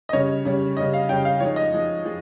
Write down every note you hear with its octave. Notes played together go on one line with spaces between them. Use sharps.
D#5
C#3 G3 C#4 C#5
C#3 G3 C#4
C#3 G3 C#4 D#5
F5
C#3 G3 C#4 G5
F5
F3 G#3 D#4 C#5
D#5
F3 G#3 D#4
F3 G#3